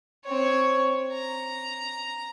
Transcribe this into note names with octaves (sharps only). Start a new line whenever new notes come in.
C4 C#5
A#5